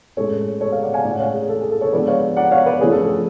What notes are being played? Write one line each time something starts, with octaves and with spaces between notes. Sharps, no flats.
A2 G#3 C#4 A4 C#5
A4 C#5
C#5 F5
D5 F#5
F5 G#5
A2 G#3 C#4 D5 F#5
C#5 F5
G#4
A4
G#4
A4
A4 C#5
F3 G#3 B3 D4 B4 D5
C#5 F5
D5 F#5
C#5 F5
B4 D5
F3 A3 C#4 G#4
A4
A4